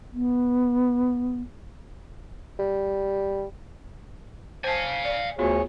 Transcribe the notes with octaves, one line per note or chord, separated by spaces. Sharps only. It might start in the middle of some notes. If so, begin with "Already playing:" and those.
B3
G3
C5 F5 G#5 A5
D5
D2 B3 F4 F#4 G#4 C#5